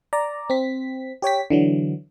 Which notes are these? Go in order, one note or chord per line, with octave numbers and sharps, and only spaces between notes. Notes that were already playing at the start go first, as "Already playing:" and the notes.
D5 A#5
C4 B6
G4 C#5 G5 B6
D3 E3 F#3